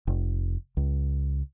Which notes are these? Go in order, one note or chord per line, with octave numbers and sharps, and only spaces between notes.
F1
C#2